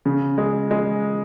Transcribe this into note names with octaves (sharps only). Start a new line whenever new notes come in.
C#3
G#3
G#3